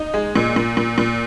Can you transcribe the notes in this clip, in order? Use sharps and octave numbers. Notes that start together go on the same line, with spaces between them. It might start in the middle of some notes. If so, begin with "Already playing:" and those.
Already playing: D#4
G#3
A#2
A#2
A#2
A#2